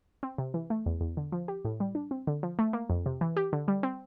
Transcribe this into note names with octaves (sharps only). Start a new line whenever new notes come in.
C4
C3
E3
A3
E2
E2
D3
F3
G4
A2
G3
D4
C4
D3
F3
A3
A#3
F2
C3
E3
G4
D3
G3
C4